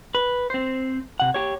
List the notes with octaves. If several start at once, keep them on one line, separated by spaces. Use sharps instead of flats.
B4
C4 C5
C3 F#5
G4 C#5